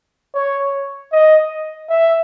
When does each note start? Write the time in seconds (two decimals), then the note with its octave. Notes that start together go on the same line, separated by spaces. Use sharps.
0.35 C#5
1.12 D#5
1.90 E5